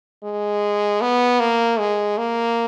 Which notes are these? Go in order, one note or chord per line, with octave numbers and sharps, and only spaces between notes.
G#3
B3
A#3
G#3
A#3